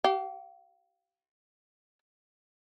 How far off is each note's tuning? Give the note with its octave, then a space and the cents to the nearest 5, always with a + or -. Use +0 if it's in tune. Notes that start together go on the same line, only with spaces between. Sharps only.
G4 -40 F5 +0